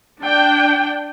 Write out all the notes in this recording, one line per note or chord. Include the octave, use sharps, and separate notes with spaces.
D4 G5